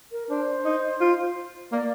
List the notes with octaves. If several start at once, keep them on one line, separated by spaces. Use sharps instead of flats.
A#4
D4 C5
D#4
F4
A#3 D5